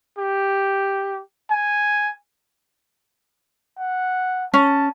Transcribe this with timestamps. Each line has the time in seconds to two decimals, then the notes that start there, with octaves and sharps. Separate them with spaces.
0.18 G4
1.50 G#5
3.78 F#5
4.54 C#4 A5